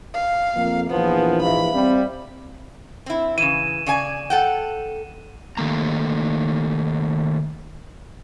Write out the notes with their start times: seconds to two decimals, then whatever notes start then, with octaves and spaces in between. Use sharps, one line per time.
0.14 F5
0.56 F2 A#3
0.90 A#1 E3 F3 B3
1.42 G#2 E5 F5 B5
1.74 G3 C4
3.06 C4 E4
3.38 C#3 E3 D#7 E7
3.87 C#3 D5 G#5
4.30 A4 F#5 G5
5.58 D#3 A3 A#3 A#5